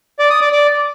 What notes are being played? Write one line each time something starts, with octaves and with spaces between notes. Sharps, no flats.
D5
D#6
D5
D5